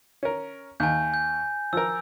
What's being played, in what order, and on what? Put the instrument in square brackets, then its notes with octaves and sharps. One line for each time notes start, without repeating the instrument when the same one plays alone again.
[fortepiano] C#4 A#4
[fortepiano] D#2 [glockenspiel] G#5 G6
[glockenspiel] G6
[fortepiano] F3 A#4 [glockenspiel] E6